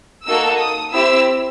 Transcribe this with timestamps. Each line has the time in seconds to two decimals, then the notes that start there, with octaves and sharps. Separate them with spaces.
0.25 A#3 D#4 F#4 A4 E6
0.59 D#6
0.92 C4 E4 G4 E6